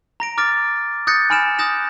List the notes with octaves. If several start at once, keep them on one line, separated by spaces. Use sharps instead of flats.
A#5 A#6 D7
D6 F6 A6 A#6 D7
D#6 F#6 G6 A6 A#6 C#7
G#5 B5 F6 D7 E7
D#6 F#6 G6 A#6 E7